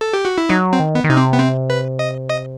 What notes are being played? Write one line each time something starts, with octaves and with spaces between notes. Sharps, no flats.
A4
G4
F#4
E4
F#3 D#4
C4
D#3
B3
D#3
C3 D#4
C4
B3
C4
B4
D#5
D#5